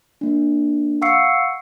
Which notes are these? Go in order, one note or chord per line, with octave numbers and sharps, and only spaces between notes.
A#3 D4
F5 F#5 C#6 E6 C7 C#7